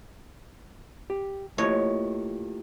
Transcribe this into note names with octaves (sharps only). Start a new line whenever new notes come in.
G4
A3 A#3 E4 F4 G4 C#5 D#5